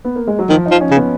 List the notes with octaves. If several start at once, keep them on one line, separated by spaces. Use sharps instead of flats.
B3
A#3
G#3
F#3
D#3 F3
D#4
F3
C#4
C#3
B3